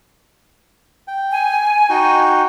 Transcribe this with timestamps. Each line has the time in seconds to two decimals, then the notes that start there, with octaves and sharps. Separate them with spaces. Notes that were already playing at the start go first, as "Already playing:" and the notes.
1.08 G5
1.31 G#5
1.89 D#4 F#4 G5